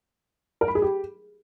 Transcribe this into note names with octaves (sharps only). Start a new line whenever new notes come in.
A#4
B5
G#4
G4